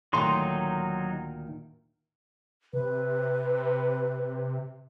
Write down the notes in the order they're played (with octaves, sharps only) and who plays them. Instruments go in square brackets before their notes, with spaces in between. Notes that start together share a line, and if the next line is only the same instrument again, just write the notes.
[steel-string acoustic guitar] D2 A#2 D#3 [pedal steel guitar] F#3 D#4 C6
[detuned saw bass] C3 [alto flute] B4